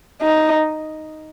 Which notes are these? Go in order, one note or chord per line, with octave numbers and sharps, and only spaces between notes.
D#4